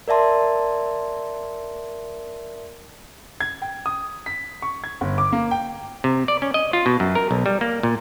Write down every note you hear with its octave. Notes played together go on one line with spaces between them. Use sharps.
A#4 D5 E5 A5 C6
G#6
G5
D#6
B6
C#6
G#6
G1
D6
A#3
G5
C3
D5
C#4
D#5
F4
B2
F#2
A#4
B1
G3
A#3
A#2